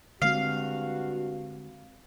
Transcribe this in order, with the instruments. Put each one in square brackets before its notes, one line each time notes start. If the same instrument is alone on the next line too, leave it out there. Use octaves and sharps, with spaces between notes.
[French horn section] G2 F#4 [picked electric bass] D3 G#3 C4 [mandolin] F5